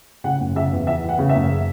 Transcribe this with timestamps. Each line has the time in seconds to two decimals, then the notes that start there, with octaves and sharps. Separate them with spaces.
0.24 C#3 F#5
0.40 F#1
0.55 C#3 E5
0.72 E2
0.87 E3 E5
1.04 E3 F#5
1.19 C#3
1.29 E5
1.35 F#1